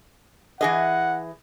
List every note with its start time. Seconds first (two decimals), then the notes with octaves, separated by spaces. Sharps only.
0.61 E3 G#4 D#5 F#5